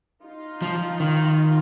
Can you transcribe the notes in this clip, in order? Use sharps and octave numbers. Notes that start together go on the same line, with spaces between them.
D#4 F4
F3
D#3